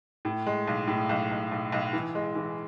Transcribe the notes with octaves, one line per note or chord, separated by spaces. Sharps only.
A2
G#3
B1
A2
B1
B1
B1
B1
E3
G#3
E3